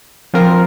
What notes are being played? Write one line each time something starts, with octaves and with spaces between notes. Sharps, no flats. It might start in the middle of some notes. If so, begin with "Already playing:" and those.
F3 C4 F4 A#4